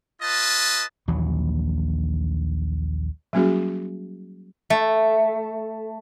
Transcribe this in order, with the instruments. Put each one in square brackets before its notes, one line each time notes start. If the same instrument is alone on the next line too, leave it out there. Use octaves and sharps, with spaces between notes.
[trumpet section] F4 B4 D#5 A5
[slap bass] A#1 D#2 E3 F#3
[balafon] F#3 G3 A#3 C#4 F#4 G#4
[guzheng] A3